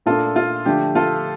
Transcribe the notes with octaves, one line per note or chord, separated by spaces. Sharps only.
A#2 A3 D4 F4 A4
F4
D3 F3 A3 D4 G4
F4 A4